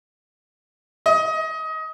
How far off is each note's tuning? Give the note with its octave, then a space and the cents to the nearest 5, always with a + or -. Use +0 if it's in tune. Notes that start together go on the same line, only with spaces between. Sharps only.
D#5 +25